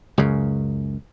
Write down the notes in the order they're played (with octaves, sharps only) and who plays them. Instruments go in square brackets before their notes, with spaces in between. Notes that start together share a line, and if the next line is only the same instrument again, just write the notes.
[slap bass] C#2 F#2 C#3